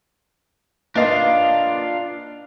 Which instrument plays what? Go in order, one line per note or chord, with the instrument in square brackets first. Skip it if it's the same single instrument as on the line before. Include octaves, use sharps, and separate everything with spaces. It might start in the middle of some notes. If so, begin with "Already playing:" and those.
[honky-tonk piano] A#3 B4 D#5 [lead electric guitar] D4 F4